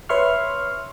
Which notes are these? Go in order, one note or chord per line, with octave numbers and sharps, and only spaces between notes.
B4 C#5 E5 C6 C#6 F6